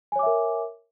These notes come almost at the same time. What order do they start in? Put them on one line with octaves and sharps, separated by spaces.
G#5 C#5 D6 E5 A#4